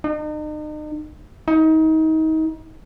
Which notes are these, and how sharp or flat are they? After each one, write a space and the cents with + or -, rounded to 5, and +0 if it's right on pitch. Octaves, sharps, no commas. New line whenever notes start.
D#4 -40
D#4 +30